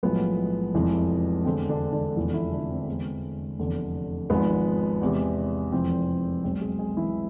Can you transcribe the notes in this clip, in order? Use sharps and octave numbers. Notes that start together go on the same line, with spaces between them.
B1 A2 F3 G#3 B3
F1 F2 E3 G#3
E2 D3 G#3 C4
D3 D4
D3 D4
F1 E2 D3 E3 F3 G#3 E4
E3 E4
D3 D4
C4
E2 D3 G#3
F1 E2 D3
G#1 G#2 F3 G#3 B3
E2 C3 G#3
F1 F2 E3 G#3 C4
B1 B2 G#3 C4
G#3 G#4
G#3 G#4
E3 E4